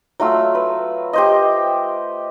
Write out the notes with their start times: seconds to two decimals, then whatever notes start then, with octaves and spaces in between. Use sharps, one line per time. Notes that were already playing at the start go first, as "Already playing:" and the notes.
0.20 F#3 A3 F4 E6
0.55 B4
1.13 G4 C5 D#5